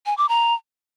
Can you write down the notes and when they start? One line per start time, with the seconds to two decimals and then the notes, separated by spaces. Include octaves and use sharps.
0.06 G#5
0.17 D6
0.29 A#5